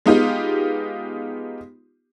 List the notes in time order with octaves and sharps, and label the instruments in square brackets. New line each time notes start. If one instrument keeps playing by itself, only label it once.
[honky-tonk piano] G#3 B3 D#4 F4 G4